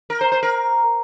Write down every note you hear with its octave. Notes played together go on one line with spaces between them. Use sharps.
A#4
C5
C5
A#4